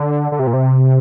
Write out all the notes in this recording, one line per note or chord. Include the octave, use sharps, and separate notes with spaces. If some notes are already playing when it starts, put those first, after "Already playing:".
Already playing: D3
D3
C3
A#2
C3